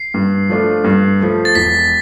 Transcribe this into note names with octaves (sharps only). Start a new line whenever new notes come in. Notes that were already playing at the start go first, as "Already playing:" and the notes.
Already playing: C7
G2
F3 A3 D4 F4
G2
F3 A3
A6
E1 B6